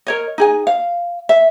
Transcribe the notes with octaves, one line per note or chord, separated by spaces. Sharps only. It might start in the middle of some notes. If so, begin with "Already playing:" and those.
A#4 C#5 D#5
D#4 G#4 G#5
F5
E5